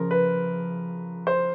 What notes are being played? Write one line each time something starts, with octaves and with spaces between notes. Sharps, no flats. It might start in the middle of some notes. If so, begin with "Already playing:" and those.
Already playing: C#3 F3 A#4
B4
C5